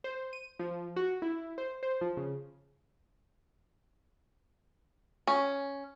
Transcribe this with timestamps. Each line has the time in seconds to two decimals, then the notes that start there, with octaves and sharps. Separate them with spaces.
0.04 C5
0.33 D#7
0.59 F3
0.96 F#4
1.22 E4
1.58 C5
1.83 C5
2.01 F3
2.17 C#3
5.27 C#4